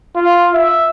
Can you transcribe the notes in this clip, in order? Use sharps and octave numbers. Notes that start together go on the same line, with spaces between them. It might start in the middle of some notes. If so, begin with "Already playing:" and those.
F4
E5